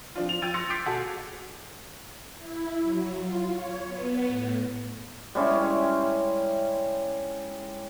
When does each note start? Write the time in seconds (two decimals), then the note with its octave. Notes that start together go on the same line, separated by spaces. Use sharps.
0.15 F3 C4 D4 F4
0.29 F7
0.42 F3 G5 E6 G#6 A6 D#7
0.54 C6 E6 F#6 A6 A#6 C#7
0.70 D6 G6 A6 B6 C7 D7
0.86 B2 F#4 G#4 A4
2.38 E4
2.81 F#3
3.16 F4
3.50 C#5
3.87 B3
4.28 A2
5.35 G3 G#3 C#4 E4